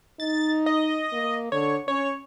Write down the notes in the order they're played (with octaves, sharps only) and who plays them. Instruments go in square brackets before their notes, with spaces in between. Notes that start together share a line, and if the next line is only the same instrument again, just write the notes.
[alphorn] D#4 [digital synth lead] A6
[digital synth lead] D#5
[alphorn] A#3
[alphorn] D3 [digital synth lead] C#5
[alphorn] C#4 [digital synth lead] C#5